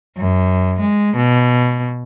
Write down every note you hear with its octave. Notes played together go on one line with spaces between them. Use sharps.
F#2
G#3
B2